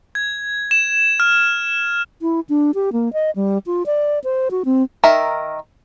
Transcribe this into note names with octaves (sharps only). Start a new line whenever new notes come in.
G#6
E7
F6
E4
D4
G4
A#3
D#5
G3
F4
D5
C5
F#4
C4
D#3 A#4 E5